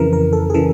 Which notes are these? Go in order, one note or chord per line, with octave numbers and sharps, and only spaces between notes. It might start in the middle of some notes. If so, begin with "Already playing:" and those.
Already playing: F2 C#3 E3 A#4
A#4
A4
G#4
C#3 E3 A4